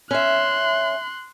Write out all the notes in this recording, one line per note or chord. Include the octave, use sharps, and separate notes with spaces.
C#4 E5 C6 F#6